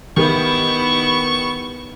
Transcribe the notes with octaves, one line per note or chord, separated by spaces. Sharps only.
D#3 B3 E4 G4 C#6